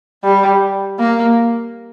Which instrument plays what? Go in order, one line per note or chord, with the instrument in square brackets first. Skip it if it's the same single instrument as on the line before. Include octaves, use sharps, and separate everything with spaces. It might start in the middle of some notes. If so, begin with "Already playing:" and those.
[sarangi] G3
A#3